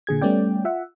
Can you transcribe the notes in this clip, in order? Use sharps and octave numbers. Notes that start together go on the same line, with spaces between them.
A#2 D3 G#4 G#6
G3 A3 B3 C#4 D5 G5
F4 E5 F#5